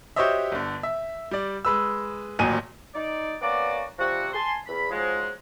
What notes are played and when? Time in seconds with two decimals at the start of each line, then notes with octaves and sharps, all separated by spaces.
0.16 F#4 G4 C5 C#5 D#5 E5
0.52 G1 D3
0.83 E5
1.31 G3 D5
1.65 G#3 B4 E6
2.39 D#1 A1 D#2 F#3 G#5 D#7
2.94 D#4 D5
3.41 A#3 B3 C#4 F#4 D5
3.98 C3 F3 G3 F#4
4.33 G#5 A5 C6
4.66 E2 B5
4.90 G#2 F3 F#3 G#3